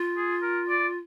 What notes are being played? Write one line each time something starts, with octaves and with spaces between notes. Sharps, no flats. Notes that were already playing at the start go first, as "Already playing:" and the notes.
Already playing: F4
G#4
A#4
D5